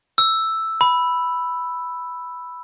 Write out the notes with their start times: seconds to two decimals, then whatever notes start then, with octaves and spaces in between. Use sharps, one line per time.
0.18 E6
0.81 B5